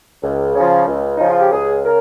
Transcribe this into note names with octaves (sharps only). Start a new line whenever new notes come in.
C#2
C#3 F3
C#2
C#3 F3 D#4
F4
G4
C#2 G#4
C#3 A#4